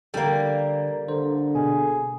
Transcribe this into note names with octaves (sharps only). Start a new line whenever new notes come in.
D3 G3 A#3 D4 A4
D3 C5
B2 G#4